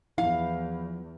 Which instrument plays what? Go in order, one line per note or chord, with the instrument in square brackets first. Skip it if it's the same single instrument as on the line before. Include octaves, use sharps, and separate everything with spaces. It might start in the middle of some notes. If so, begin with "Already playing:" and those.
[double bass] E2 [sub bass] F3 [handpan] E4 [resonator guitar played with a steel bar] F5